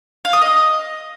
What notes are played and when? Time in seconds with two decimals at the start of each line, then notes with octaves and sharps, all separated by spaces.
0.25 F5
0.33 D#6
0.42 D#5